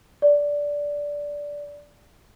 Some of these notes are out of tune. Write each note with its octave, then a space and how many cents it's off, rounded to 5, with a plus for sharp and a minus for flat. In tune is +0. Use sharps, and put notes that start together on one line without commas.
D5 -10